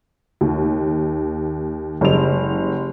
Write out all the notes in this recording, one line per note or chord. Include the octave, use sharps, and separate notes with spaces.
D#2
F#1 G3 G#3 F7